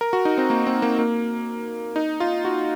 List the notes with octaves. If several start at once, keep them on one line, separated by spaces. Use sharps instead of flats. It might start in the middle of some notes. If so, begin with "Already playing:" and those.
A#4
F#4
D#4
C4
A#3
C4
A#3
A#3
D#4
F4
F#4